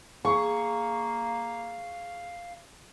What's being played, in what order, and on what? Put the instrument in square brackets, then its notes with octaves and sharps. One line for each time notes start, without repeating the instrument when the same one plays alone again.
[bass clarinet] A#3 [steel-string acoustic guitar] G#4 [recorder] F5 [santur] C#6